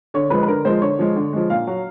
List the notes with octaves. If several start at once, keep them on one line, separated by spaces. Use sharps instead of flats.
D3 C#5
F3 G#3 B4
B4
D3 A#4
F3 G#3 C5
D3 C#5
F3 G#3
D3
F3 G#3
A#2 F5
F#3